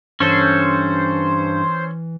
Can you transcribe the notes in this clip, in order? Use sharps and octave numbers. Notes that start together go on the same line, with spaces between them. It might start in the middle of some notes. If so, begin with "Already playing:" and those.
G2 E3 C#4 A4 C5